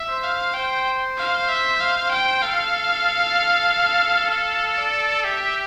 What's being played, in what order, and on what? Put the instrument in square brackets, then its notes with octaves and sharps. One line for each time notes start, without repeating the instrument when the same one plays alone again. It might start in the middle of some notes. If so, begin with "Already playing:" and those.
Already playing: [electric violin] E5
[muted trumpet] C5
[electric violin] F5
[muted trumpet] C5 [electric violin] G5
[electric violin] F5
E5
F5
G5
[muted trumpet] A4 [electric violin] F5
[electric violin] F5
D5
[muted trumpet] G4 [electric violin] E5